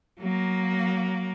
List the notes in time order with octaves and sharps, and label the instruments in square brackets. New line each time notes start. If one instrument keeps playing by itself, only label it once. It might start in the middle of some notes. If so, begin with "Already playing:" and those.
[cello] F#3 A#3